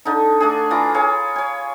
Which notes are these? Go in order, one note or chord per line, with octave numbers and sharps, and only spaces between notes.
D3 D#4
A3 D4 G#4
E3 F4 A#5 D6
G#4 C#5 F5
C#5 G#5